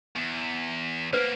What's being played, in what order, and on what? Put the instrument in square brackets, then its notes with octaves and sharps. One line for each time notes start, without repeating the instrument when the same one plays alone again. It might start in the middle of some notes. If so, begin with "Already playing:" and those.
[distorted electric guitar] E2
[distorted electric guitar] A#3 B3 [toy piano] B4 C5